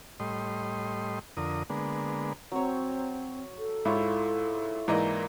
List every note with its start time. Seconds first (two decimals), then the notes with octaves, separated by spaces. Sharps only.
0.20 A2 G3 D#5 C6
1.37 F2 D3 A#4 D#6
1.70 D3 G#3 A#3 B3
2.52 F#3 C4 C#5
3.58 A4
3.85 G#2 E4 F4 C#5
4.88 G#2 E3 A#3 D5 D#5 A#5